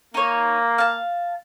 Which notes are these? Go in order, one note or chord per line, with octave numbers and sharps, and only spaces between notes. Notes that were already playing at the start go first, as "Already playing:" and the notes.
A#3 D#4 C#5
F5 A5